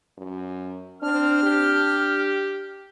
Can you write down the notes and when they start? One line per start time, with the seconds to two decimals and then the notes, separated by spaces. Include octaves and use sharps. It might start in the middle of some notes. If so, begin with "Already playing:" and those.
0.18 F#2
1.02 C4 D4 F6
1.43 G4